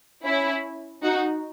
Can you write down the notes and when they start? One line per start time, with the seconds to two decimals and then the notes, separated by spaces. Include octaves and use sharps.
0.25 C#4 E4
1.04 D#4 F#4